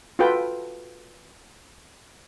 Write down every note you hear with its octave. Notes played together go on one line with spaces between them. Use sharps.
F4 F#4 A4 B4 G5